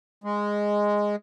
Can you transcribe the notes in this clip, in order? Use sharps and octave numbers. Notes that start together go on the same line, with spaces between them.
G#3